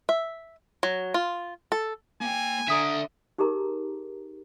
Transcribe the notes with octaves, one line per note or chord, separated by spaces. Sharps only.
E5
F#3
F4
A4
A#3 G5 G#5
D3 D5 E5 A#5 D#6 B6
D#4 G4 G#4 A#4 A#5